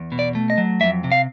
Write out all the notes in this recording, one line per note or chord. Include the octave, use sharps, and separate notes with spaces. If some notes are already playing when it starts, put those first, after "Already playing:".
Already playing: E2
B2
D5
A3
D#5
F#3
F2 E5
C3
F5